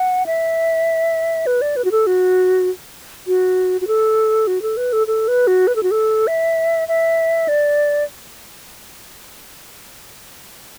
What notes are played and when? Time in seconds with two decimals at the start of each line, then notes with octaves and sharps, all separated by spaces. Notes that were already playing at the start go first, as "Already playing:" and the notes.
Already playing: F#5
0.26 E5
1.47 B4
1.62 D5
1.76 B4
1.85 F#4
1.92 A4
2.07 F#4
3.27 F#4
3.81 F#4
3.87 A4
4.47 F#4
4.62 A4
4.77 B4
4.93 A4
5.07 A4
5.28 B4
5.47 F#4
5.67 B4
5.76 A4
5.83 F#4
5.91 A4
6.27 E5
6.88 E5
7.48 D5